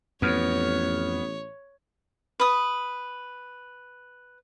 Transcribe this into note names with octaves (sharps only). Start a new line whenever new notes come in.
A1 F2 B3 C#5 F6 G#6
B4 D#6